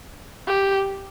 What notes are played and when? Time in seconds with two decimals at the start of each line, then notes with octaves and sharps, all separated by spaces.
0.47 G4